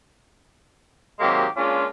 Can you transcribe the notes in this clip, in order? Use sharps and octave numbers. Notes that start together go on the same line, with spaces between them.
C3 D#3 F#3 G#3 A#3 G4
G#3 A#3 C#4 D4 F4